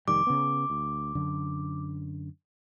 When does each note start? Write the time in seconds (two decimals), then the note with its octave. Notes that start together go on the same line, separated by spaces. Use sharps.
0.08 F1 D#3 G3 D6
0.27 C#3 B3
0.70 D2
1.15 F#2 D3